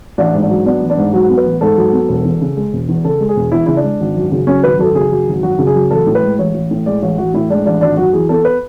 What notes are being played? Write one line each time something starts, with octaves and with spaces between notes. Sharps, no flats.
A1 D4
G#2
D4
F#3
B3 D4
A1
D4
G#2
F#3 F#4
B3
B4
A1
G#2 A4
F#3
B3
E1
E2
C#3
G#3
E1
E2
C#3 A4
G#3
G#4
E1
E2 E4
C#3 E4
D4
G#3
G#1
F#2
C#3
F#3 C#4
G#1 B4
F#2 A4
C#3 G#4
F#3
G#1
F#2 F#4
C#3
G#4
F#3
A1 A4
A2
B4
G#3
A1 C#5
A1
A2
G#3 D5
A1 C#5
A1 F#4
A2 E4
G#3 D4
A1 D4
G#1 D4
F#2 F#4
E3 G#4
B3 A4
B4